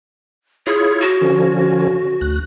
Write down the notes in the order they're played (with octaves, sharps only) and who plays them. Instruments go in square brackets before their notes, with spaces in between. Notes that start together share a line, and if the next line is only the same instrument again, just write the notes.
[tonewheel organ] E4 F4 C#5 [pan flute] G#4
[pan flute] F#4
[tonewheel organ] D3 F3 C#4
D2 F#6